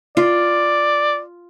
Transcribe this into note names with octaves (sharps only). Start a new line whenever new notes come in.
F4 D5